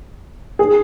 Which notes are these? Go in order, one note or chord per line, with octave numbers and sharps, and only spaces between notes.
G#4